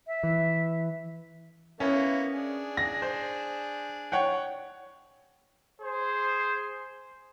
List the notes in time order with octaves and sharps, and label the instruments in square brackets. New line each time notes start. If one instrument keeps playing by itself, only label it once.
[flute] E5
[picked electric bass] E3
[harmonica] A#3 B3 E4 [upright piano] C#4
[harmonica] D4 G#4
[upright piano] A#6
C5
C#5 F#5 G5
[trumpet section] G#4 C5